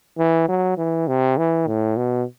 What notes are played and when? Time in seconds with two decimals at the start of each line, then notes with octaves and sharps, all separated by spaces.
0.18 E3
0.48 F#3
0.78 E3
1.08 C3
1.38 E3
1.68 A2
1.97 B2